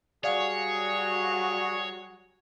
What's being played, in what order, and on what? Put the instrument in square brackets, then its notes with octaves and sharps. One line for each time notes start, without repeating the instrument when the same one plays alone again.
[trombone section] F#3 G3 F#4 [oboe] G#4 [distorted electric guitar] C#5 [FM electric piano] D5 F5 F#5